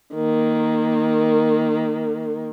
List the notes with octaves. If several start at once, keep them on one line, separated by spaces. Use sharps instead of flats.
D#3 A#3